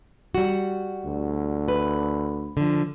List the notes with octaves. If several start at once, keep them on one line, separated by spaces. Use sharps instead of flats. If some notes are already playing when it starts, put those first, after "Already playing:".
G3 F#4
D2
B4
D3 F3